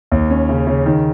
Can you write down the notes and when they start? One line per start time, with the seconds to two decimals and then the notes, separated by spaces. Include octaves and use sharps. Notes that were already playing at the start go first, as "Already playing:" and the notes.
0.12 D#2
0.30 C#4
0.49 C#3
0.67 C#3
0.86 D#3